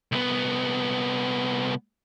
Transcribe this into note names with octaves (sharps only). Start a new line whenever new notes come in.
C2 B3